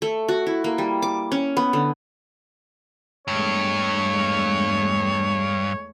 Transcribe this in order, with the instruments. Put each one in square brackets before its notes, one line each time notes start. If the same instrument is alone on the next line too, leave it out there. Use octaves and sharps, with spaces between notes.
[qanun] A3
F#4
E4
A#3
G3
D6
C#4
B3
D3
[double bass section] E2 G#3 A3 [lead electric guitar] G2 [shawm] C#5